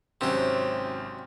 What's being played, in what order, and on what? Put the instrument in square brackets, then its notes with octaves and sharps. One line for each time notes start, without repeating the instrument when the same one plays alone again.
[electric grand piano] G#1 C4 C#4 [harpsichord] C3 F#3